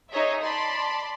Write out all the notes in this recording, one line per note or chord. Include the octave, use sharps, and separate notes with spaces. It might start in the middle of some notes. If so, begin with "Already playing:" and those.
D#4 G#4 C#5 D#5 E5
D5 A5 B5 C6